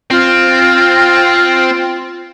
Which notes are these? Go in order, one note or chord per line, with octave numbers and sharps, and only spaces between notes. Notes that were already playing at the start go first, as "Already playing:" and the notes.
C4 F4